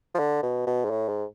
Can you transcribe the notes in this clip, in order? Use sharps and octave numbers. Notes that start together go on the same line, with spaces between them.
F3
D3
B2
B2
G#2
A2
G#2